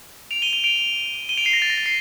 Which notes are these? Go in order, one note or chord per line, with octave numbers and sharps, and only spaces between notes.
D7 F7
D#7 G7
D#7 G7
D7 F7
D#7 G7
D7 F7
C7 D#7
A#6
A6
A#6
A6
C7